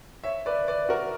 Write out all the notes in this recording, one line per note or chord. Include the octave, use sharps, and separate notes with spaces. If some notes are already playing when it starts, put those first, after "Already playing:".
C#5 E5
B4 D5
B4 D5
F#4 A#4